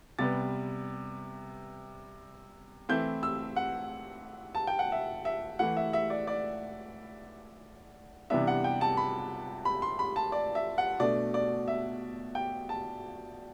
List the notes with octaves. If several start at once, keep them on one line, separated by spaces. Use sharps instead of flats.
C3 G3 B3 A6
E3 A3 C4 E4 G6
E6
F#5
A5
G5
F#5
E5
E5
E3 A3 E4 F#5
E5
E5
D5
D5
C3 E3 G3 B3 D4 E5
F#5
G5
A5
B5
B5
C6
B5
A5
D5
E5
F#5
B2 A3 D4 D5
D5
E5
G5
A5